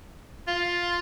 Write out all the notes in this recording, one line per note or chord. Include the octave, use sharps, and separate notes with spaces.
F4